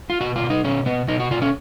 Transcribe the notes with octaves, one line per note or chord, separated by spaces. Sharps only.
F4
B2 F#4
F4
B2
D#4
B2 C#4
B2 B3
B2 D#4
F#4
B2 F4
C#4